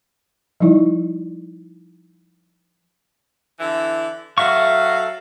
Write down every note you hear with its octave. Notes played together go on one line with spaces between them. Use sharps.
F3 G3 D#4 E4 D5
D3 E3 E4
F#3 F#4 A4 E5 F5 C#6